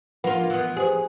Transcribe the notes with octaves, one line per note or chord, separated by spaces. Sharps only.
F3 A#3 F4 B4 F#5
E3 B3
G4 G#4 C5